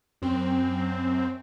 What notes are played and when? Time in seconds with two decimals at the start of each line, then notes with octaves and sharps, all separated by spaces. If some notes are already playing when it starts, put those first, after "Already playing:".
0.22 F#2 C4